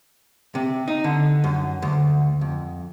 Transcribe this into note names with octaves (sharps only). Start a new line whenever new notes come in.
C3
D#4
D3
F#2
D2
F2